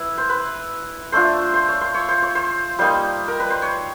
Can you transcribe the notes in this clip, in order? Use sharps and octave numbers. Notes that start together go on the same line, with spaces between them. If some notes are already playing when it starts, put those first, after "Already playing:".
Already playing: E4 B4
C5
B4
A3 D4 F4 C5
C5
C#5
C5
C#5
C5
C#5
C5
G3 A#3 D#4 C5
A#4
B4
C5
C#5